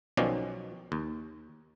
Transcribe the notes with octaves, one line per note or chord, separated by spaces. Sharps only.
B1 B2 D#3 F3 C#4 D5
D#2